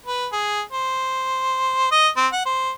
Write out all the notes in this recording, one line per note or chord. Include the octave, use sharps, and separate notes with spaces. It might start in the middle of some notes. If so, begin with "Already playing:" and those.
B4
G#4
C5
D#5
C4
F#5
C5